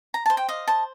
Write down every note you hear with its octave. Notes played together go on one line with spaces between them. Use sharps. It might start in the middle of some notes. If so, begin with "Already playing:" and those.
A#5
C5 A5
G5
D#5 F5
C5 A5